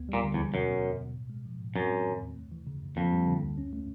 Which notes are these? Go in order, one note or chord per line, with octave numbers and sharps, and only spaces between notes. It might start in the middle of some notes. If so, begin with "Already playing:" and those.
Already playing: D2 B3
A#2 G3
D3
E2
D#2
F#2 B2
B3
F#3
B2
A2
G#3
F3
A2
F#2 C4
G#3
D#3
D#2
A3
E3
C#3
F#2
F2 A#3
G3
D3
D2
C#4
A3